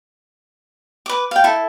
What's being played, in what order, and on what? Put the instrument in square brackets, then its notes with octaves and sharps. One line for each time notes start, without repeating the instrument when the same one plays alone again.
[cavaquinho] B4 D6
F5 G5
E4 A4